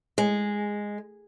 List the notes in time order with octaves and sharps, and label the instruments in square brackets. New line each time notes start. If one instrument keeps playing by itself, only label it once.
[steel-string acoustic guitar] G#3